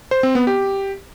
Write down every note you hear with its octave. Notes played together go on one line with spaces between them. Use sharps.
C5
C4
B3
G4